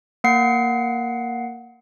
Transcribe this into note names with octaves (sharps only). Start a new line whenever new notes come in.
A#3 F#5 C7